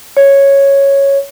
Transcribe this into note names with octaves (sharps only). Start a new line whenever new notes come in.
C#5